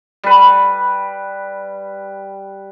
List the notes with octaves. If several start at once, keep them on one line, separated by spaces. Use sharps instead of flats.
G3 B4